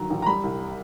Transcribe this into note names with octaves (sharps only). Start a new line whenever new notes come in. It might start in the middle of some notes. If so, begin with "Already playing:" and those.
Already playing: G1 D#3 F#3 A#5
A1
A#5
G3 B5
C2